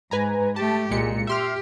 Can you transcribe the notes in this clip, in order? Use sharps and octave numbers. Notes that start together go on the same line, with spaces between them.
G#2 B4 G#5 A#5
A3 G4 A5
C2 A#2 G#3 C#7
G4 E5 C6 F6